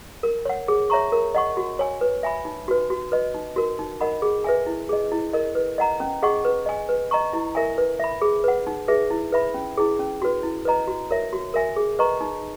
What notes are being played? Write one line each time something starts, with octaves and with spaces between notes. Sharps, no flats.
A#4
C#5 F#5
G#4
C#5 E5 A#5 C#6
A#4
D#5 F#5 C#6
F#4
C#5 G#5
B4
E5 G#5 B5
D#4
F#4 B4
F#4
B4 D#5
D#4
F#4 A#4
D#4
A#4 D#5 F#5 B5
G#4
B4 E5 G#5
E4
G#4 D#5
E4
A#4 D#5
B4
D#5 F#5 A#5
C#4
G#4 D#5 F#5 C#6
B4
D#5 G#5
B4
D#5 A#5 C#6
E4
A#4 E5 G#5
B4
E5 B5
G#4
B4 F#5
D#4
G#4 B4 E5
E4
B4 E5 B5
C#4
E4 G#4
C#4
F#4 B4
E4
B4 D#5 A#5
F#4
A#4 C#5 E5
F#4
A#4 E5 G#5
G#4
B4 D#5 A#5 C#6
D#4